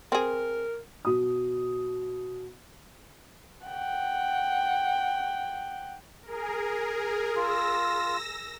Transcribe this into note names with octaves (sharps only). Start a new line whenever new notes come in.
C4 G#4 A#4
B2 D#6
F#5 G5
G#4 A#4
F4 E6 A#6